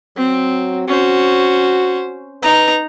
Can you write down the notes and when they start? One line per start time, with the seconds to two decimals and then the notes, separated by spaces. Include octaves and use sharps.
0.17 F#3 C4
0.88 C#4 F#4 C5
2.42 D#4 B4 A#5